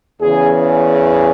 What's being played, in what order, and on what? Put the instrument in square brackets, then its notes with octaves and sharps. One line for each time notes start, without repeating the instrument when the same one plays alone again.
[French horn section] E2 C#3 E3 G#4